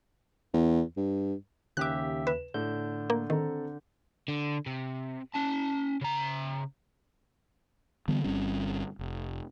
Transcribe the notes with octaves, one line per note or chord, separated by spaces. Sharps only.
E2
G2
D#2 C#3 G4 E5 D6 F#6
B4 E7
A2 D3 G6
A#3
D#3 C4 A4 A#5
D3
C3
C#4 A5
C#3 A#5
D3 E3 G3 B3
G1 G3 C4 C#4
F1